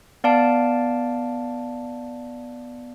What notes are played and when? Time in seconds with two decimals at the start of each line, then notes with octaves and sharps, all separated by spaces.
0.24 B3 D5 F5 A5 D7